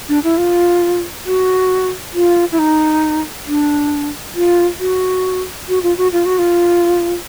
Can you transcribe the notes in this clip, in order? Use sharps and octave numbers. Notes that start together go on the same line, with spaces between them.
D4
E4
F4
F#4
F4
E4
D#4
D4
F4
F#4
F#4
F4
F#4
F4
F#4
F4